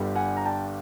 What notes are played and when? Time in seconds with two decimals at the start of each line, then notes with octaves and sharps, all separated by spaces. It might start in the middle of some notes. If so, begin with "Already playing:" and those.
Already playing: G1 G2 D3 G3
0.15 F#5 G#5
0.37 A#5
0.45 G5 A5